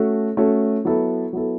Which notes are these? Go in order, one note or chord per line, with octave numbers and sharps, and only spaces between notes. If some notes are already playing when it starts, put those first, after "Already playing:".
Already playing: A3 C#4 F#4 A4
A3 C#4 F#4 A4
F#3 B3 E4 A4
F#3 B3 E4 A4